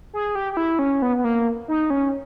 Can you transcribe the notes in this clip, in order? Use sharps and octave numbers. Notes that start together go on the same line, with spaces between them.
G#4
G4
G4
E4
C#4
B3
B3
A#3
D#4
C#4